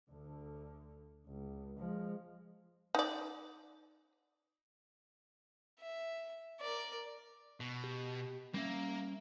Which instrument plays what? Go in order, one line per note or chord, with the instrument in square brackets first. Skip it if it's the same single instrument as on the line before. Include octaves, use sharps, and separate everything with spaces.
[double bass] D2 D3
C#2
F3 G#3
[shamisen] D#4 D5
[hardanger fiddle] E5
A#4 D5
[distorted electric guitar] B2
[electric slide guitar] G4
[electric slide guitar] G3 C#4 E5 [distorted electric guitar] A#3